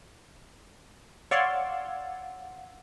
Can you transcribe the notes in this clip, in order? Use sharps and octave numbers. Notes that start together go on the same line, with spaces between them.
C#5 D5 F5 F#5 C6 E6